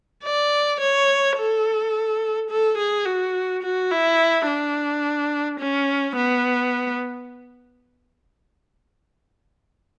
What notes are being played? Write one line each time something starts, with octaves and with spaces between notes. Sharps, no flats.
D5
C#5
A4
A4
G#4
F#4
F#4
E4
D4
C#4
B3